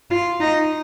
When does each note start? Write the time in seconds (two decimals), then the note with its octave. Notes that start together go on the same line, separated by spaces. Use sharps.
0.11 F4
0.40 D#4